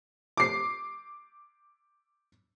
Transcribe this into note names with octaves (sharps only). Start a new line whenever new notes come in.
D6 C7